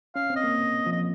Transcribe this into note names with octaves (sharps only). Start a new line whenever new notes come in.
C#4 F5
C4
D#5
A#3
F3
D#5